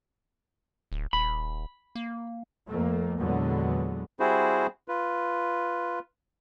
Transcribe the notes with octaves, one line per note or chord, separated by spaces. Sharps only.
D1
D#1 B5
A#3
F2 A3 A#3
E2 A#2 D3 F#3 G#3 B3
G3 C4 E4 F#4 G#4 C5
F4 B4